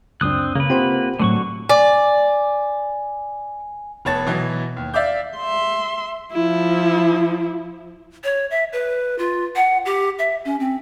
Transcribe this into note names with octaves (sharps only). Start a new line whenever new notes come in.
C#2 F#2 C4 D4 D#6 F#6
C#3 A#3 B4
C4 F4 G4 C5 F#5
A2 D3 F#3 A3 F#4 C#6
D5 G#5
F1 B3 C#5 A5 A6
B2 E3 F#3
D#2
D5 E5 F5 D6 G6
E5 C6
F3 E4
C#5
E5
B4
F4
F#5
G4
E5
C#4
C4